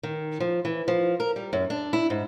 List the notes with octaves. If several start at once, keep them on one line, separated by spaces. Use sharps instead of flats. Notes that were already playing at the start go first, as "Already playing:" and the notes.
D#3
F3
E3
F3
A#4
G3
F#2
D4
E4
G#2